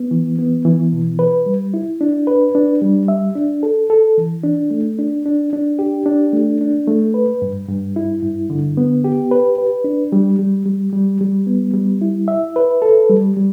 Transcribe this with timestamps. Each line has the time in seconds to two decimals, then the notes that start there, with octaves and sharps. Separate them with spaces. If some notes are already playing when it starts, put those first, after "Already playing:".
Already playing: B3
0.11 E3
0.39 B3
0.65 E3
0.93 B2
1.19 B4
1.46 G3
1.74 E4
2.01 D4
2.27 B4
2.55 D4
2.82 G3
3.08 E5
3.35 D4
3.63 A4
3.90 A4
4.18 E3
4.44 D4
4.71 A3
4.99 D4
5.26 D4
5.53 D4
5.79 G4
6.06 D4
6.33 A3
6.61 D4
6.87 A3
7.14 B4
7.42 G2
7.68 G2
7.96 E4
8.23 G2
8.50 D3
8.77 B3
9.04 G4
9.31 B4
9.58 B4
9.84 D4
10.12 G3
10.39 G3
10.66 G3
10.93 G3
11.21 G3
11.47 B3
11.74 G3
12.01 E4
12.28 E5
12.56 B4
12.82 A4
13.09 G3
13.36 G3